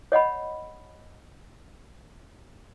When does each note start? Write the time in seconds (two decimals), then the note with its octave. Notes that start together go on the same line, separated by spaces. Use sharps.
0.12 C#5 D#5 F#5 B5